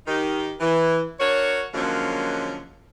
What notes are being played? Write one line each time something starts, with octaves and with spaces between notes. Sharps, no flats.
D#3 D#4 G4
E3
D4 F#4 A#4 C#5
D3 F3 F#3 G#3 A#3 C#4